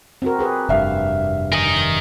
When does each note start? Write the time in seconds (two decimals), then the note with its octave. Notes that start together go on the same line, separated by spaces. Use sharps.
0.22 C4 F#4 A#4
0.39 G4 G#4 B4
0.69 F1 G2 E5 F5
1.52 A#4 D#5 G#5